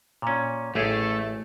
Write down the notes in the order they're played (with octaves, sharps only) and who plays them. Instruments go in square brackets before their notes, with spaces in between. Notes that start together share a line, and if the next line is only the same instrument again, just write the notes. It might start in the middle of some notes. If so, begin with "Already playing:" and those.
[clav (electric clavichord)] A#2 C#4
[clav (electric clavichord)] A1 G4 G#4 [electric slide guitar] A3